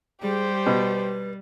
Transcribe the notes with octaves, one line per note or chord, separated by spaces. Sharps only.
G3 G4 G#4 C5
B2 B4